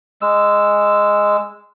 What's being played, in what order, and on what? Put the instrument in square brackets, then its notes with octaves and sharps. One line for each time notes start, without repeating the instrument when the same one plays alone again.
[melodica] G#3 E6